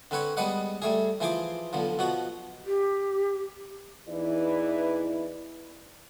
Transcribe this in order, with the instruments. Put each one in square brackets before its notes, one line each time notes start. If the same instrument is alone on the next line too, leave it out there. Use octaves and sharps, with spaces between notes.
[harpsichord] D3 C4 B4 C#5
G3 G#3 B3 B4 D#5 F#5
G3 A3 G#4
E3 F3 G#4 C5 D6
B1 D3 F3
B2 F3 F#4
[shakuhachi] G4
[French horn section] E2 E3 D#4 E4 B4 D5